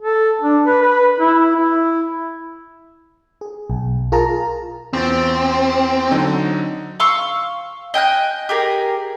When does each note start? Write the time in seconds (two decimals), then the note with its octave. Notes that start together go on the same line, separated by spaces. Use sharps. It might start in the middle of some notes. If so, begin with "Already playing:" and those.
0.02 A4
0.42 D4
0.66 B4
0.82 B4
1.20 E4
1.56 E4
3.41 G#4
3.70 B1
4.12 F4 G#4 A#4 A5 A#5
4.93 E2 C4 F4 A6
6.11 D3 F#3 D#4
7.00 F5 C6 C#6 E6
7.94 D#5 G5 G#5 F#6
8.49 G4 G#4 A#4